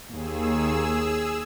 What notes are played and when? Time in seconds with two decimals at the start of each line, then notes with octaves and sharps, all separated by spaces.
0.11 D#2 G#4 E6